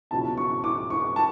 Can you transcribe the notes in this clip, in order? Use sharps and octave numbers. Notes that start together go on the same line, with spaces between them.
C#2 B2 F#3 C#4 E4 A5
C#6
D6
C#6
A5